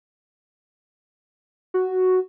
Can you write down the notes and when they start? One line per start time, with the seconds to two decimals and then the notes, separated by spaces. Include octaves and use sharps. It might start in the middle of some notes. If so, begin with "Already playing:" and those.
1.74 F#4